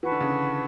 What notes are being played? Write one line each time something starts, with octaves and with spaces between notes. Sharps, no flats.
E3 B4 F#5 A5 C#6
D3
C#3
D3